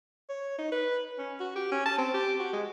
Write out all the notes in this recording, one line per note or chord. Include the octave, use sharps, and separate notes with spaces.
C#5
D#4
B4
C#4
F#4
G4
C#4
A5
C4
G4
F#4
G#3